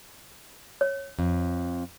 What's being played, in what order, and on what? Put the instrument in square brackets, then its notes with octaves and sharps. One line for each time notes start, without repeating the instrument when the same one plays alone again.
[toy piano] C#5
[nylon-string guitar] F2